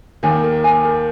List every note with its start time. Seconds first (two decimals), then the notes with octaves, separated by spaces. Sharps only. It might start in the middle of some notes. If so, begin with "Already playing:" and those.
0.23 D#2 D#3 G#5
0.43 A#4
0.64 G#5
0.84 A#4